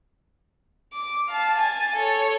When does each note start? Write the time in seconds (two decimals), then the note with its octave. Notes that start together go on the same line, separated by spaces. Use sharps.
0.93 D6
1.29 F5 A5
1.58 G#5 A6
1.96 A4 C#5